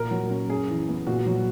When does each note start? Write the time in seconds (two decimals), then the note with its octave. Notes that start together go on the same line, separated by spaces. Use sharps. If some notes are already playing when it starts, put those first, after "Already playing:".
Already playing: A#2 A#4
0.11 F#3
0.30 C#4
0.49 F#2 G#4
0.70 E3
0.89 B3
1.07 A#2 F#4
1.26 F#3